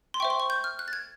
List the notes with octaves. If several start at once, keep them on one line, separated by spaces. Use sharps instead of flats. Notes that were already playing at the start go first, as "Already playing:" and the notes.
C6
C5 E5 G5 C#6
C6
C#6
G6
F6
F#6
A6
G#6